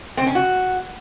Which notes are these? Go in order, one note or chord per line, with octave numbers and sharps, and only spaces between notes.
C4
C#4
F#4